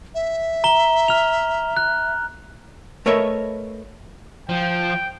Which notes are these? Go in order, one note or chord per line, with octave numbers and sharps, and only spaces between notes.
E5
A#5 E7 G7
F6 F7
F#6
A3 A#4 B4 C#5 D#5 E5
F3 G5